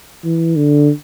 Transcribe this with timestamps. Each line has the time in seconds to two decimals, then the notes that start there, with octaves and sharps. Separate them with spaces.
0.24 E3
0.56 D3